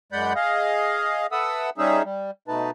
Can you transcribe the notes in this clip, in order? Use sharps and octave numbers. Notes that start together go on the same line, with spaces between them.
F#2 G#3 D5 F#5 B5 G6
G#4 D#5 F5
A4 B4 E5 F#5 D#6 E6
G3 C#4 D#4 G#4 E5
G3
B2 A3 D#4 B4 A5